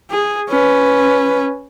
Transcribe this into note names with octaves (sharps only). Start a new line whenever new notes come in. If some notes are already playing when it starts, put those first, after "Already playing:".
G#4
C#4 B4